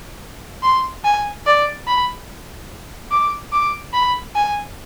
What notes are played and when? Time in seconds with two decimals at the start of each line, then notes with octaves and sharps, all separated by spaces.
0.63 C6
1.04 G#5
1.46 D5
1.87 B5
3.11 D6
3.52 D6
3.93 B5
4.35 G#5